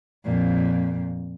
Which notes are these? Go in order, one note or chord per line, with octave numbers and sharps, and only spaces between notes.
F2 A#2